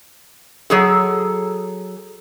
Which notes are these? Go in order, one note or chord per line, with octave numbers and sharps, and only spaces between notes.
F#3 G#4 A4